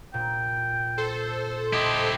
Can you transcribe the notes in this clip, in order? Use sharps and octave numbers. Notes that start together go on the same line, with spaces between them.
A#2 G5
A4 C5
E4 G4 D#5